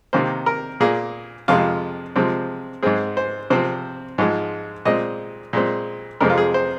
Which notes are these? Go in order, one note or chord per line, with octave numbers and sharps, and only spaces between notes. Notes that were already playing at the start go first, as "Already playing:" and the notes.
C3 D#3 A#3 C5
A#4
A#2 A#3 G#4
F2 C3 F3 G#3 F4
C3 F3 G#3 C4
G#2 G#3 C4 G#4
C5
C3 F3 C4 C5
G#2 F3 G#3
A#2 G#3 C4 D#5
A#2 G#3 C4
F2 C3 G#3 C4 A#4
F4
G#4
C5